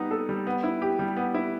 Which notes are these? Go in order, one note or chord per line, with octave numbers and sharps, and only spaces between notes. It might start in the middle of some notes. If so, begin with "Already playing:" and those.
Already playing: G3 B3 D#4
A4
G3
B3
E4
G4
G3
B3
E4